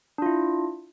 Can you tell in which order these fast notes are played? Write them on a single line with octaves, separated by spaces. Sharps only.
D4 F4 E4